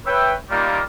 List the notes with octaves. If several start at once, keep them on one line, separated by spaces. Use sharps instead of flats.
B4 C#5 E5 G5
D#3 G3 A#3 F4